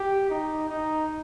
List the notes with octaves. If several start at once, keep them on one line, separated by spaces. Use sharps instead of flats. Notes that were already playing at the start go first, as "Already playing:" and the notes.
Already playing: G4
D#4
D#4